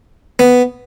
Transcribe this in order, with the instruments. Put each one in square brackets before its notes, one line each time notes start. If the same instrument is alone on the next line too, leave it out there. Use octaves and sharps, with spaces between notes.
[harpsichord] B3